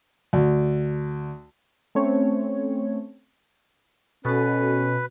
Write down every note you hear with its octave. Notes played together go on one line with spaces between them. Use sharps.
D2
A3 C4 C#4 C#5
B2 C#4 F#4 A4 B4